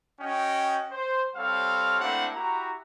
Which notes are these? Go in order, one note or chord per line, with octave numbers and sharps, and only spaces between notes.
C#4 F#4 D#5 G5
C5
G3 C4 A4 C#5 F5
A3 A#3 C4 D4 E4 F#5
E4 F#4 G4 A#5